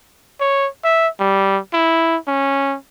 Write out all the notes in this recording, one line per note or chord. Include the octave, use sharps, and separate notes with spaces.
C#5
E5
G3
E4
C#4